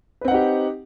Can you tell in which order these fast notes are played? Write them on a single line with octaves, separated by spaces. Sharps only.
B4 C4 F#5 D#4 G4